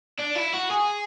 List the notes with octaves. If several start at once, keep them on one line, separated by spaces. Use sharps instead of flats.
D4
E4
F#4
G#4